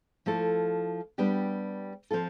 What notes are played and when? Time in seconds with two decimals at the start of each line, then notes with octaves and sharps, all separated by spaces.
0.26 F3 A3 E4 A4
1.18 G3 B3 D4 G4
2.11 F3 C4 F4 A4